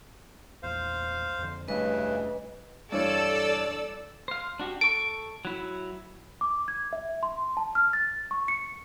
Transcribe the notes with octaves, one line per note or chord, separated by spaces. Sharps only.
A#1 E2 C5 F5
F2 D3
F1 G2 C#3 E3 G3 A3 B4 D#5
G2 E3 A4 C#5 D5 E6
C5 F5
D4 F#4 G4
A4 C#6 D7
F#3 E4 F#4
D6
G#6
E5
C6
A5
F6
A6
C#6
C#7